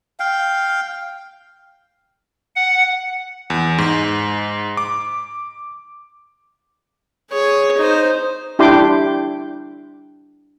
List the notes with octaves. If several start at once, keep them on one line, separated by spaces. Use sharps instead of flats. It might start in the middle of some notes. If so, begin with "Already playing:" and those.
F5 G5
F#5
E2
G#2
D6
G#4 C#5
D#4 C5
D4 E4 G4 G5 C6 D6